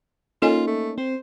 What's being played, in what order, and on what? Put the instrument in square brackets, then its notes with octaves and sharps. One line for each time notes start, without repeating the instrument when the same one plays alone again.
[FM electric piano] A#3 C#4 D#4 [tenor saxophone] F4 [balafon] A4 D#5 G#5
[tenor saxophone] A3
[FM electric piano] C4 [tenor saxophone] C5